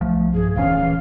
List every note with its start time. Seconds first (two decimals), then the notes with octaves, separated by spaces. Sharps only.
0.01 B1 F3 A3
0.34 G2 G#4
0.56 D1 A#1 E3 C#4 F5
0.83 E3